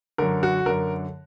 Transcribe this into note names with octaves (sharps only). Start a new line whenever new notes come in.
F#2 D3 A#4
F#4
F#2 D3 A#4